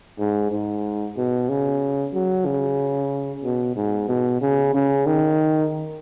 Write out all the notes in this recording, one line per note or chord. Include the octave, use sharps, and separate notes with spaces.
G#2
G#2
B2
C#3
F#3
C#3
B2
G#2
B2
C#3
C#3
D#3